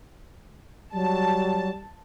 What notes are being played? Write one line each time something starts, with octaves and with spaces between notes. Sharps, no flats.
F#3 G3 A5